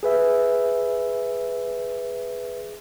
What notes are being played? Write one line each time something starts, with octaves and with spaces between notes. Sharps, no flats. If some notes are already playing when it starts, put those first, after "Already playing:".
G#4 B4 E5